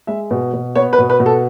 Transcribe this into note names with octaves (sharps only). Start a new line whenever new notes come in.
G#3 E5
B2
B2
B3 C#5
B4
B2
B4
B2
A4